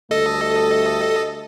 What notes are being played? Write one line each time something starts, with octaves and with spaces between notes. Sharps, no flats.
D2 G3 A3 A4 D#5